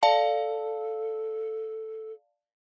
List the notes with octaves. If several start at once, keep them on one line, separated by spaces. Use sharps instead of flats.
A4 D5 F5 A5